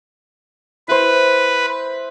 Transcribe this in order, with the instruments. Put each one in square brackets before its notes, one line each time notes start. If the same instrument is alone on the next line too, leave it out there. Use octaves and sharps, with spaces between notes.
[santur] E4 C5 [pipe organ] B4